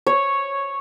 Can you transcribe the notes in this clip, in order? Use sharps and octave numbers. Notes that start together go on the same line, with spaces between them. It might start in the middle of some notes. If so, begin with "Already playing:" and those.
C#5